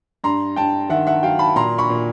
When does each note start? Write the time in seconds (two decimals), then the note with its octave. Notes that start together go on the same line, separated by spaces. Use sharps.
0.24 G2 A#5 C6
0.56 G2 G5 A5
0.89 D#3 E5 F#5
1.07 E5 F#5
1.23 F#3 F5 G5
1.39 A5 B5
1.56 A#2 A#5 C6
1.78 B5 C#6
1.90 A#2